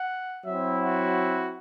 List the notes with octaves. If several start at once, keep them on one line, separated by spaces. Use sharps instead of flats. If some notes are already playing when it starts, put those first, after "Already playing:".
Already playing: F#5
F#3 C4 E4 E5
F#4